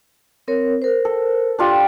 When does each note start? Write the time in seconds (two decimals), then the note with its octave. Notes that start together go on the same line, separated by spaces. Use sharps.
0.48 C4 A#4 C#5
0.82 A#4 C5
1.05 A4
1.59 D4 F4 G4